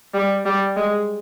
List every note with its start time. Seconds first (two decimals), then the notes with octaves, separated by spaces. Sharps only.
0.14 G3
0.45 G3
0.76 G#3